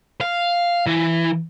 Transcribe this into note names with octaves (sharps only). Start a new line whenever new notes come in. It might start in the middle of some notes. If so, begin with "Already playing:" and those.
F5
E3